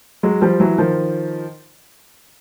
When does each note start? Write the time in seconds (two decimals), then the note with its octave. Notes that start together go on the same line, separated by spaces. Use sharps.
0.23 F#3 G#3
0.41 F3 G3
0.60 E3 F#3
0.78 D#3 F3